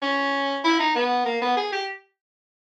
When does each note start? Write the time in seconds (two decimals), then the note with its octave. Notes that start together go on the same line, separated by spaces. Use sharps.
0.02 C#4
0.64 E4
0.79 D#4
0.95 B3
1.25 A#3
1.42 B3
1.57 G#4
1.72 G4